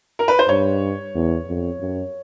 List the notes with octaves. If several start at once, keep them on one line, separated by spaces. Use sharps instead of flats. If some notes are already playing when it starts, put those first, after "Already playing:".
A#4
B4
C5
G2 C#5
E2
F2
F#2